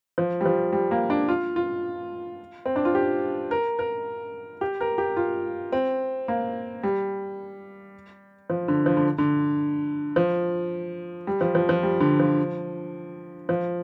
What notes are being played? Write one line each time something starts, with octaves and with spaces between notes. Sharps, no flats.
F3
G3
F3
G3
A#3
D4
F4
F4
C4
D4
F4
G4
A#4
A#4
G4
A#4
G4
F4
C4
A#3
G3
F3
D3
F3
D3
D3
F3
G3
F3
F3
F3
G3
D3
F3
F3